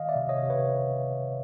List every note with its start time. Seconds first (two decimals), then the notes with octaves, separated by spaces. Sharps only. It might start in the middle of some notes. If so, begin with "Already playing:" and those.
Already playing: D#3 D#5 F5
0.09 D5 E5
0.16 C3
0.29 C#5 D#5
0.43 C3
0.50 B4 C#5